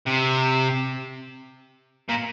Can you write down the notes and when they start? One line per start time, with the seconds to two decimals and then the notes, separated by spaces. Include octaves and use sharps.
0.07 C3
2.09 A#2